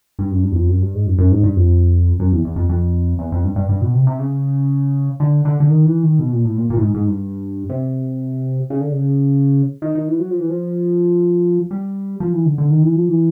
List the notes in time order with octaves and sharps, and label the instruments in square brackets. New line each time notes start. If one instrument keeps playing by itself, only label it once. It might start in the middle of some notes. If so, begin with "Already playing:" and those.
[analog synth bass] G2
F#2
G2
E2
F2
F#2
G2
G#2
F#2
F#2
G#2
G2
F2
F#2
E2
E2
F2
F2
E2
F2
G2
G2
G2
B2
C3
C3
C#3
D3
D3
D3
D#3
E3
D#3
B2
A#2
A2
A#2
A#2
A2
G#2
G#2
G2
C3
C#3
D3
C#3
D#3
D#3
E3
F#3
F3
E3
F3
G3
F3
E3
D3
D3
D#3
E3
F3
E3